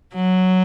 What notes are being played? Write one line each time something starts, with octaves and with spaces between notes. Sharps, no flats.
F#3